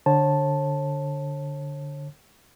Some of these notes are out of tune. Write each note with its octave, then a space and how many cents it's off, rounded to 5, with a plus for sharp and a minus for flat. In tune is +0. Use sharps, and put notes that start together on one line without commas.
D3 +0 C#5 -40 A5 +0